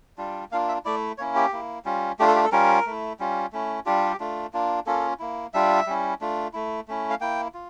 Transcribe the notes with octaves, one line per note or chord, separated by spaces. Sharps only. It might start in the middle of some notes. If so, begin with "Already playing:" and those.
G3 D4 F4
A#3 D4 F4 F5
E5
A3 E4 D5
A#3 C#4 E4 C#5
G4
A#3 E4
G3 C#4 F4
A3 D4 F4 G4
A4
G4
A4
G3 C#4 F4 A#4
A3 E4
G3 C#4 F4
A3 C#4 E4
G3 D4 F4 G4
A3 D4 F4
A#3 D4 F4
A#3 C#4 F4 A4
A#3 E4
G3 D4 F4 E5
G3 C#4 E4
A3 D4 F4
A3 E4
A3 C#4 E4
F5
A#3 E4 G5
F4